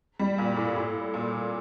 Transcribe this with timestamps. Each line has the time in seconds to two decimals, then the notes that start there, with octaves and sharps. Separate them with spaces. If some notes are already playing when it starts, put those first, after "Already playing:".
0.19 G3
0.38 A#2
0.57 A2
0.76 A2
1.14 A#2